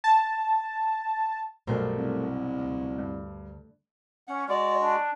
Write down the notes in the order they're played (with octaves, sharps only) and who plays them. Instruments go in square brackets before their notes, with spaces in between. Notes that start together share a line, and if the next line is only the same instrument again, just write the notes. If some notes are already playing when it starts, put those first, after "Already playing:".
[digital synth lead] A5
[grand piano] B1 G2 [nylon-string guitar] A3 A#4 C5
[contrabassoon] C2
[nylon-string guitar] D2
[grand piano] G2
[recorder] C#4 [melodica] F#5
[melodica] G#3 F#4 [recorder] D5
[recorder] D4